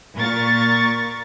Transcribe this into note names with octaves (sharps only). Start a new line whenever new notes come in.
A#2 A#4 C#6 A6